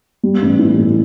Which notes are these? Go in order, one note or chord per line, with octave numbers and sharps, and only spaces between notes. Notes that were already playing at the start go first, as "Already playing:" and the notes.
G3
A1
E3
A2